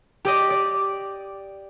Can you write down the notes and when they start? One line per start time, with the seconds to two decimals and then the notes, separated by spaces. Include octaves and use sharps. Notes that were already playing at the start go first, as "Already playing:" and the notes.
0.25 G4 D5 D#5
0.50 D5